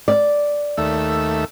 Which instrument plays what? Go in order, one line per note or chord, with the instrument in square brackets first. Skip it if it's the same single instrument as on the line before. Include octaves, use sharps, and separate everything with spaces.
[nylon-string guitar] D5
[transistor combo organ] D#2 A3 E5